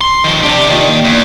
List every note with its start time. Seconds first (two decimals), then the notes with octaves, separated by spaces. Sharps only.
0.01 C6
0.24 D#3 F3
0.43 C3 D4 G4
0.68 A#2 D#3 G4 C#5
1.05 E2